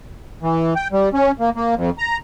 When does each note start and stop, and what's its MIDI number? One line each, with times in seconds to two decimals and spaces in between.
0.42 0.74 52
0.76 0.88 79
0.92 1.09 55
1.14 1.32 61
1.40 1.50 58
1.56 1.75 58
1.76 1.90 41
1.98 2.17 82